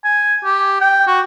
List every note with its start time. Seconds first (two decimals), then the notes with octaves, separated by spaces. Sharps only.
0.04 G#5
0.44 G4
0.81 G5
1.07 F#4